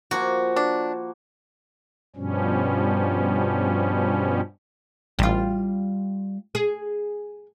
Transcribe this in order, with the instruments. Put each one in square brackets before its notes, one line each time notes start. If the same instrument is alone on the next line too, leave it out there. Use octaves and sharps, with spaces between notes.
[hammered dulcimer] F3 A#3 [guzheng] F#4
[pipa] D4
[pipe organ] G2 B2 F3 G3 C#4
[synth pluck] A1 [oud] G3 F4
[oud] G#4